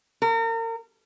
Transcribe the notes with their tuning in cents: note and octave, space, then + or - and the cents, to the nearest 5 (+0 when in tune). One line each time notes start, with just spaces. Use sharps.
A#4 -35